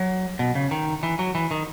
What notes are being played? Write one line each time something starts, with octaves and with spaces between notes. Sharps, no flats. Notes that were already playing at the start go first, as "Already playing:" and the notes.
Already playing: F#3
B2
C#3
D#3
E3
F#3
E3
D#3